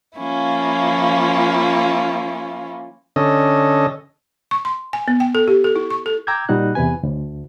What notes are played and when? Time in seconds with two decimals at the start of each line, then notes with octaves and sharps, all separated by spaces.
0.18 F3 A#3 C#4 E4 F4
3.16 D3 C#4 A4 D#5
4.51 C#6
4.65 C6
4.93 G#5
5.08 B3
5.20 G5
5.35 A4
5.48 G4
5.64 A4
5.76 E4
5.90 C#6
6.06 A4
6.27 G5 A#5 D6 E6 G6 G#6
6.49 A#2 G3 D#4 F#4 F#6
6.75 E2 C3 B4 G#5
7.03 D2